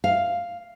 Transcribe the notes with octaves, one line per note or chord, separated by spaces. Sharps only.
F5